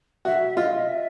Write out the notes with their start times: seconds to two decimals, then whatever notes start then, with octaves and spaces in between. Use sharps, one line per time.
0.25 F#4 E5
0.57 F4 D#5
0.88 E5